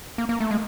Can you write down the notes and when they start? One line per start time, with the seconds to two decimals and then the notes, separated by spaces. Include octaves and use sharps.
0.18 A#3
0.29 A#3
0.40 A3
0.51 G#3